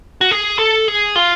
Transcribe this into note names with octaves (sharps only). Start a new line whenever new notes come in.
F#4
G#4
A4
G#4
F4